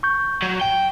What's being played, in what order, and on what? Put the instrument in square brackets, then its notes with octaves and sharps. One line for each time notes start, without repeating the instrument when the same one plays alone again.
[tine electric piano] C#6 G6
[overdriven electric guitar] F#3
G5